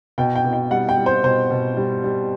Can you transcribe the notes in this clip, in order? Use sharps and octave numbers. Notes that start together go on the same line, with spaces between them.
B2 G5
G5
B2
G5
G3 F#5
G5
G3
C5
B2 C5
B2
G3
G3